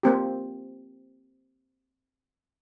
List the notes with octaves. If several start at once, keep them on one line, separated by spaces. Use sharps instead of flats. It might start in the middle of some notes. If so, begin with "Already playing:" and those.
A#3 C4 G4